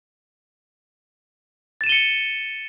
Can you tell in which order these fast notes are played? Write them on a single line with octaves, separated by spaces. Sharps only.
A6 E7 D#7 G7 C#7